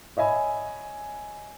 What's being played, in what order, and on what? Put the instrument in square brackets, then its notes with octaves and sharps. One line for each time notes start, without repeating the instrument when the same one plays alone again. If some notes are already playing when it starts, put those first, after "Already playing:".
[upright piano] C#5 D#5 E5 G#5 B5